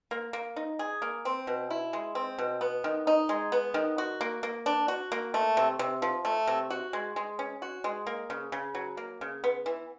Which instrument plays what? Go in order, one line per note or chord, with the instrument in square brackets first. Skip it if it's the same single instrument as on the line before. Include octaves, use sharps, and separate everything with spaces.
[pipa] A#3
A#3
D#4
G#4
A#3
C4
B2
E4
G#3
C4
B2
B3
D#3
D#4
G#3
B3
D#3
F#4
A#3
A#3
D4
F#4
A#3
A3
C3
C3
F3
A3
C3
F#4
G#3
G#3
C#4
F#4
G#3
A#3
C#3
C#3
F#3
A#3
C#3
B3
E3